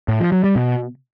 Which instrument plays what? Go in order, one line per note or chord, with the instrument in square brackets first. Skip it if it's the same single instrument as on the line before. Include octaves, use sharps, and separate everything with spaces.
[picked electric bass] A2
F3
F#3
G3
B2